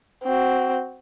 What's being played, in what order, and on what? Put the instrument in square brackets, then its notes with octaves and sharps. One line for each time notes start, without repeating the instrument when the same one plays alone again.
[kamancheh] C4 F#4